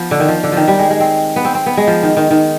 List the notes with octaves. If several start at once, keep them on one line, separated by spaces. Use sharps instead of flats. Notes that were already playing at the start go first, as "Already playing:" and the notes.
Already playing: F3 B3
D3
D#3
F3
D3
D#3 F3
G3
G#3
G#3
C4
B3
C4
C4
B3
G#3
F3
D#3
D#3
D#3